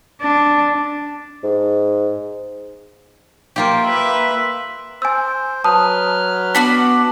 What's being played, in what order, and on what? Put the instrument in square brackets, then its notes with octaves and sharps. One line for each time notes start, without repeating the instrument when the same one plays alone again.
[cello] D4
[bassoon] G#2
[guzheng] A#3 F4 G4
[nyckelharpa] B4 E5
[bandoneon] C5 [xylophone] G#5 E6
[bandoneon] F#3 B4 F6 [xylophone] A5 D#6
[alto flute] B3 [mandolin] D4 F#4 D5 [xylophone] B6